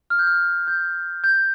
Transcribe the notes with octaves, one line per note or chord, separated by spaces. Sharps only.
F6
G6
F6
G6
G6